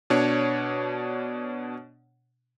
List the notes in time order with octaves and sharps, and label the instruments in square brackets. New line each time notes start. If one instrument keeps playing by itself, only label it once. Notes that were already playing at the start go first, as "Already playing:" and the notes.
[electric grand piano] B2 D4 C#5